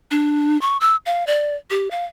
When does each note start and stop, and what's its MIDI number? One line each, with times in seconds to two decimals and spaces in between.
0.11 0.59 62
0.61 0.77 85
0.81 0.96 88
1.06 1.26 77
1.27 1.56 74
1.70 1.91 67
1.91 2.05 77